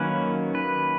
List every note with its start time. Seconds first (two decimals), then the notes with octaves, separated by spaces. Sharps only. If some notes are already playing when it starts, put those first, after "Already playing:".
Already playing: D#3 F#3 A#3 C#4 B4
0.55 B4